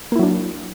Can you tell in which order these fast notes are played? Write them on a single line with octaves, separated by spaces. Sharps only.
A#3 E4 F#3 D4